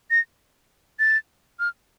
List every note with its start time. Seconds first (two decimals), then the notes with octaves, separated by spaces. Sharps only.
0.11 A#6
0.99 A6
1.60 F6